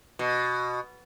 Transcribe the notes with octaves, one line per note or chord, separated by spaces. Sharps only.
B2